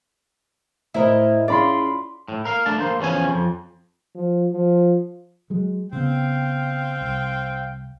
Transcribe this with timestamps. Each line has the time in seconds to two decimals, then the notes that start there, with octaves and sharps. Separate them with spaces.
0.94 A2 E4 A#4 C5 D#5
1.48 C#4 E4 F4 G#4 D5 B5 C6
2.28 A2
2.45 A#4 F5
2.66 A3 D4 A5
2.79 A#3 C5
3.00 E2 D#3 F3 C#4 G#5
3.30 F2
4.15 F3
4.52 F3
5.50 F#3 G#3
5.93 C#3 B3 C4 F5 G5
7.01 C2